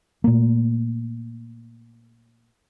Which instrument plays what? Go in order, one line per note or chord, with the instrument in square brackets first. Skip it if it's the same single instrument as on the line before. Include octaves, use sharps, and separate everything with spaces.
[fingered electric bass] A#2 A3 A#3